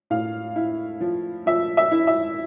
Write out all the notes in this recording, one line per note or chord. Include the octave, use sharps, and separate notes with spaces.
A2 F5
E4
F3
F3 E5
E5
E4
E5